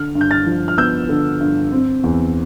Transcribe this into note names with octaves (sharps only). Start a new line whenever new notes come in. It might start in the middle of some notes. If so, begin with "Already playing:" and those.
Already playing: D3 F6
G2
G6
F6 A6
F3
F6
B3 E6 G6
D3
G2
C4
E2